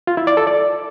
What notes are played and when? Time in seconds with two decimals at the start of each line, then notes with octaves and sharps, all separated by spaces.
0.07 F4
0.17 E4
0.27 D5
0.37 A4
0.47 D5